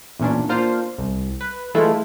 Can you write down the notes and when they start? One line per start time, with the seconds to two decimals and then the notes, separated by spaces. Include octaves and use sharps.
0.19 E2 A#2 C#4 D4
0.49 A#3 D4 F4 C5 F5
0.98 C2
1.41 B4
1.74 E3 G#3 A3 E4 F4